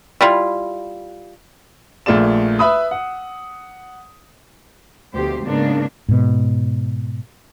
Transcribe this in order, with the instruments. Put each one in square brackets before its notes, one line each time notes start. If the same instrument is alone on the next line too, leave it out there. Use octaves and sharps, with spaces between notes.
[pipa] G3 E4 F4
[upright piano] A#1 A3 F4 G#4 D5 E7
B4 E5 B5 D#6
F#5
[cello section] D2 B2 F3 G4 C5
G#2 C#3 A#3 B3 D4 D#4
[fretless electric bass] G#2 B2